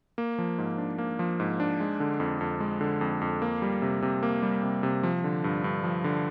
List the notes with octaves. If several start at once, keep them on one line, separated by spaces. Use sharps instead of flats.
A#3
F3
G#2
D4
A#3
F3
G#2
D4
G#3
D3
F2
F2
G#3
D3
F2
F2
A#3
G3
C3
C3
A#3
G3
C3
C3
F3
D3
G2
G2
F3
D3